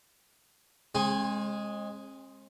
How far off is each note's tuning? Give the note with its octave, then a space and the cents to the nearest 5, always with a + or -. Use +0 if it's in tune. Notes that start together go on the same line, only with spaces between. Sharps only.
G#3 +0 C4 +45 G#4 +0